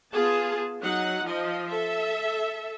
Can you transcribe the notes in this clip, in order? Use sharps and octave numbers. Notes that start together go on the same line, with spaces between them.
B3 F4 G#4 A5
F#3 D#4 F#5
F3 D#5
A4 E5